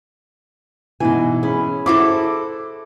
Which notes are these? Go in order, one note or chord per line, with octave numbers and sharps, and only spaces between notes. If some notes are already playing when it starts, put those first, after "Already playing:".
B2 E3 B3 D#4 G#5
C#4 G#4 B5
E4 F#4 A4 C5 D5 D6